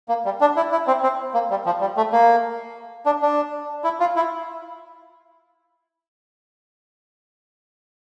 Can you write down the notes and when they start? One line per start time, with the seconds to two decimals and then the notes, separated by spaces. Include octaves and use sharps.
0.09 A#3
0.25 G3
0.41 D4
0.56 E4
0.72 E4
0.87 C4
1.03 C4
1.34 A#3
1.50 G3
1.66 F3
1.81 G3
1.97 A3
2.12 A#3
3.06 D4
3.22 D4
3.84 E4
4.00 F4
4.16 E4